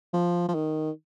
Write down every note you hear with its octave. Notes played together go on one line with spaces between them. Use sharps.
F3
F3
D#3